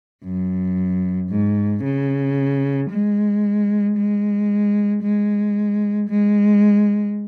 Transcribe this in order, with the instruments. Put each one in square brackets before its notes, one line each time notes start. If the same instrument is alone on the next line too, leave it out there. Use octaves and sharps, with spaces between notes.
[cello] F#2
G#2
C#3
G#3
G#3
G#3
G#3